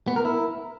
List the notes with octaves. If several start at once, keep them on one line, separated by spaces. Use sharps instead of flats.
B3
A#4
E4